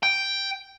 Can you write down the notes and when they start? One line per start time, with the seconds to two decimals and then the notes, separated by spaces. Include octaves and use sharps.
0.03 G5